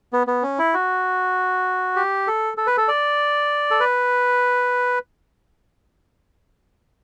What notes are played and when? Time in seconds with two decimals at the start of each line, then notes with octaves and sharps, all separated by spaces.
0.13 B3
0.27 B3
0.43 C#4
0.59 E4
0.74 F#4
1.96 G4
2.27 A4
2.57 A4
2.67 B4
2.77 A4
2.88 D5
3.71 A4
3.80 B4